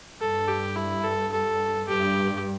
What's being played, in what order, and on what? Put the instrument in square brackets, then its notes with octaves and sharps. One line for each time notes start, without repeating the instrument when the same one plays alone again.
[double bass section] G2 [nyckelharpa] A4
[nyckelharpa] G4
E4
A4
A4
[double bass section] G2 [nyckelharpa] G4